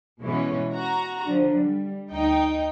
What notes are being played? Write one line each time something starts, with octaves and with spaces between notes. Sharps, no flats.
B2 E3 G#3 C#4
F#4 A#5
D3 F3
G3
D2 D#4 G5